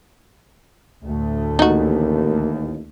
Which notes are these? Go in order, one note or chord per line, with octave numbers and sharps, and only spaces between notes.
D2 A2 A3
A1 D#2 D#4 F#4